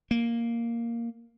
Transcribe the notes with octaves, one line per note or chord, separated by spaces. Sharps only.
A#3